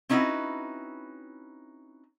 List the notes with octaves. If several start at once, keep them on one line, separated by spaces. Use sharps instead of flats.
C4 C#4 D#4 E4 F#4 B4